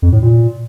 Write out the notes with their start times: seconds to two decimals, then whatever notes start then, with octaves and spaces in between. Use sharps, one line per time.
0.02 F2
0.12 A2
0.22 A#2